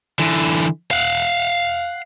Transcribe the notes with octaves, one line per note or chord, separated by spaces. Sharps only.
D3 E3
F5 F#5